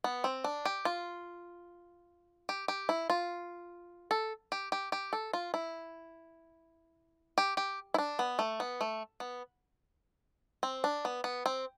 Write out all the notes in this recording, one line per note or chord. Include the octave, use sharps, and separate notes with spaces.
B3
C4
D4
G4
F4
G4
G4
E4
F4
A4
G4
G4
G4
A4
F4
E4
G4
G4
E4
D4
B3
A3
B3
A3
B3
C4
D4
B3
B3
C4